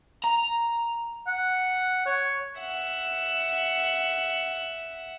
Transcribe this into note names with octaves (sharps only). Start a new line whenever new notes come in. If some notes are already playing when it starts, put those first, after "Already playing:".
A#5
F#5
C#5
E5 F#5